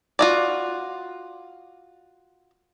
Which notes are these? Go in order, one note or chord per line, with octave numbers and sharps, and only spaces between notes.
F4 F#4 D5